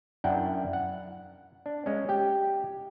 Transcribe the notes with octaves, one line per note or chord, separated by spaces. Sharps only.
F#2 D4 E4 F#5 G5
F#5
D4
G#3 C#4
G4 G5